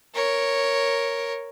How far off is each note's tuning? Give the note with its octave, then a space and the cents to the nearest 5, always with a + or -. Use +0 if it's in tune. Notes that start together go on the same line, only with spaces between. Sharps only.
A#4 +0 C#5 +0